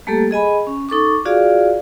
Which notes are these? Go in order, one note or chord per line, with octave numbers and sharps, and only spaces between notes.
G3 A3 A#3 G4 A4
G#4 D#5 G#5 B5
C#4
D#4 A4 C#6 D6
F4 F#4 G#4 D5 F5